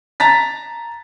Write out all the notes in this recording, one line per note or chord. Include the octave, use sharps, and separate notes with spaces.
A5 A#5 A6 B6